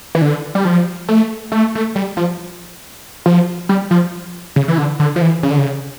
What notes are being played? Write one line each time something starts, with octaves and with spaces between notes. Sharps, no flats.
E3
D3
G3
F3
A3
A3
A3
G3
F3
F3
G3
F3
C#3
E3
D3
D3
F3
E3
C#3
D3
C#3